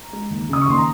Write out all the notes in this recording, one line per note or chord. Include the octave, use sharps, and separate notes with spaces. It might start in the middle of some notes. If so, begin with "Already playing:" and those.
Already playing: A#5
G#3
D#2
C#3 D#6
C#6
D#2 C6
A#5